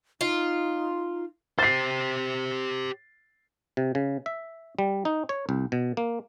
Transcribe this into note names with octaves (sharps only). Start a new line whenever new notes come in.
D#4 F4
G4 C5 A6 C7
C3
C#3
E5
G3
D#4
C#5
C2
B2
A#3